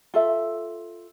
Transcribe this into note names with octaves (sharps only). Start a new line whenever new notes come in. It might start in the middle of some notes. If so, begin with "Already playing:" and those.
F4 A4 E5